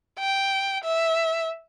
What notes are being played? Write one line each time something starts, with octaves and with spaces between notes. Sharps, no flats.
G5
E5